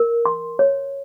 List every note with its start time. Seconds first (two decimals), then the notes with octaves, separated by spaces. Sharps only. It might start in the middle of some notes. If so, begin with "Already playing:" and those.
Already playing: A#4
0.26 C6
0.59 C#5